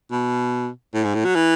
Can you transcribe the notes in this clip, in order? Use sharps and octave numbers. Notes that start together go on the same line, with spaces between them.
B2
A2
G#2
A2
F#3
E3